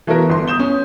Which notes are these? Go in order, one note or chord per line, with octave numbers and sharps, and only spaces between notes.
E3 A3 B3 F#4 A#4
G1 C6
D#6 G6 E7 G7
C#4